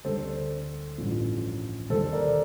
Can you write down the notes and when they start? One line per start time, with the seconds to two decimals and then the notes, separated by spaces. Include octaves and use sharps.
0.05 D2 D3 G3 A4 C5
0.98 A1 G2 F3
1.90 D#2 D3 G3 A4 C5
2.13 A#4 D5